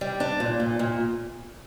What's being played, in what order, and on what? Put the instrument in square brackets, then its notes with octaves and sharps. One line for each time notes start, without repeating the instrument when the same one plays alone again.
[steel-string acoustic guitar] G3
D4
A#2
A#2
A#2